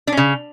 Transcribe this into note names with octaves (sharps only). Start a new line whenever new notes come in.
D4
C#4
C#3